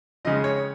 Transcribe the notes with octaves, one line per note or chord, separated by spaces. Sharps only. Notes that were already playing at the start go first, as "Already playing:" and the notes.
F2 C#3 G#3 D#5
C#5